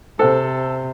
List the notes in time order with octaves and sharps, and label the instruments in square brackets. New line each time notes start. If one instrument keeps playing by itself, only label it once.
[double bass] C3 [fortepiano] A4 [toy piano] C5 G5